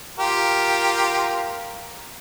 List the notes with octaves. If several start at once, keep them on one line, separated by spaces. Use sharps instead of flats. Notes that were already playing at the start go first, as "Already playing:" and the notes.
F4 G4 A#4